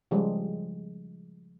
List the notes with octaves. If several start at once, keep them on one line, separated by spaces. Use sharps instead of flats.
C#3 F3 G3 G#3